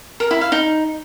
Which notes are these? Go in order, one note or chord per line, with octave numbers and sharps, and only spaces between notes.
A#4
E4
F5
D#4